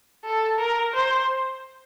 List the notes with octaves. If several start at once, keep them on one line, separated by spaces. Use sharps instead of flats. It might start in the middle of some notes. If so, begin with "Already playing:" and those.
A4
A#4
C5